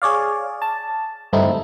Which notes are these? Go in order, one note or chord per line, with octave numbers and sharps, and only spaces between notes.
G#4 C#5 D5 F5
A5
G2 D3 A3 C4 D#4 E4